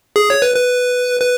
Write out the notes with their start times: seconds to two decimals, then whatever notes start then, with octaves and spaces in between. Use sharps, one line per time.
0.16 G#4
0.30 C#5
0.42 B4
0.56 B4
1.21 B4